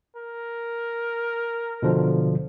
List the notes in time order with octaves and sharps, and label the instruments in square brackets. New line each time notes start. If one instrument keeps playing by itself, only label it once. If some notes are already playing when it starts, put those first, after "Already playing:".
[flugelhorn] A#4
[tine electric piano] B2 D3 F3